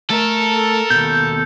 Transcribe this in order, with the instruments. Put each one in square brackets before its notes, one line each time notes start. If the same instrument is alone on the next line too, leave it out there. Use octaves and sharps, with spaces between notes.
[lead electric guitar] A3 [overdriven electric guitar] A4 [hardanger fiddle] A#4
[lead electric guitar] D#2 B2 [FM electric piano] G6